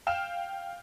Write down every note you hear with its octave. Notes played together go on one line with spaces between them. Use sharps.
F5 G5 F6 E7